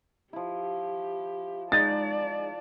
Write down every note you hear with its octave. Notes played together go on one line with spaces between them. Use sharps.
F3 E4 G4
G#3 D#4 D5 A5 A6